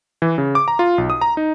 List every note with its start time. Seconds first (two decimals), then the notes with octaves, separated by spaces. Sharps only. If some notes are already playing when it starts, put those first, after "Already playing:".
0.22 E3
0.38 C#3
0.55 D6
0.68 A#5
0.79 F4
0.98 B1
1.10 D#6
1.21 A#5
1.37 D#4